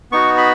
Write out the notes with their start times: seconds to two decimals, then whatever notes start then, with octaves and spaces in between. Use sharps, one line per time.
0.12 B3 D#4 F#4 C#6
0.38 B5